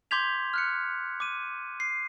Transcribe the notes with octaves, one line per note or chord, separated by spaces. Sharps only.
C6 D6 G6 G#6 B6 F7
F6 F#6 C#7
D6 D#7
C7